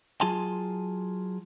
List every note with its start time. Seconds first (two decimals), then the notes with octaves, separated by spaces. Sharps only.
0.21 F#3 F4 G#4 G#5 A5 C6